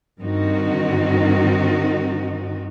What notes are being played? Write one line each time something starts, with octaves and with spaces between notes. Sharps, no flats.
G2 D#3 C4 D#4 F#4